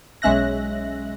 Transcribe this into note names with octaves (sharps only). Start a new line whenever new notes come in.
B1 G#3 C#4 E5 F#6 A#6